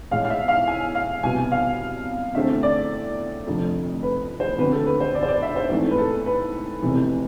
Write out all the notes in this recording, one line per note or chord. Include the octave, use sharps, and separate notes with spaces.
A1 A2 G#3 F5
F5
E5
F5
G#5
F5
C2 B2 B3 G#5
F5
E2 D3 A3 C4 E5
D5
F1 F2 D3 A3
B4
C5
D2 D3 G#3 C4 B4
A4
B4
C5
D5
C5
D5
E5
C5
G#2 E3 A3 C4
B4
A4
B4
F1 E2 C3 E3